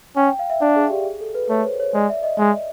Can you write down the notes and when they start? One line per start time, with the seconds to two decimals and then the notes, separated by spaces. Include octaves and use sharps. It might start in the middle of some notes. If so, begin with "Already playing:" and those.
0.16 C#4 G5
0.28 G5
0.39 F5
0.50 E5
0.61 D4 D5
0.76 G#4
0.90 G4
1.05 G#4
1.21 A4
1.35 B4
1.49 A3 C#5
1.64 C5
1.80 C#5
1.94 G#3 D5
2.09 E5
2.23 D#5
2.38 G#3 D#5